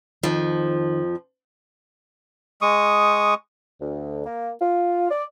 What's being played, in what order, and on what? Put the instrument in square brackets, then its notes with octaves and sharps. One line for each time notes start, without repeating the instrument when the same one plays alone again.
[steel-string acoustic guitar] F2 F3 [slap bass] D#3
[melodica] G#3 C#6 D#6
[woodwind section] D2
A#3
F4
D5